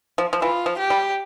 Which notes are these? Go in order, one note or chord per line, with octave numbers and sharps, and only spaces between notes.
F3
F3
E3 F4
F3
G4
G3